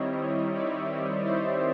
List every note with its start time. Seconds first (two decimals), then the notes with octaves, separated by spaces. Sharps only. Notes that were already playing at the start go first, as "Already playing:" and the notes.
Already playing: D#3 G3 C4 E4 C#5 D#5
0.55 D5 E5
1.25 C5 D5